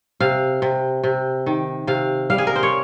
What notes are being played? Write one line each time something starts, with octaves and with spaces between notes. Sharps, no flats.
C3 F5
C3
C3
D#3
C3 F5
G3 F5
G#4
A#4
C5
C#5